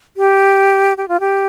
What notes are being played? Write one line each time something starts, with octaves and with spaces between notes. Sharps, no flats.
G4
G4
F4
G4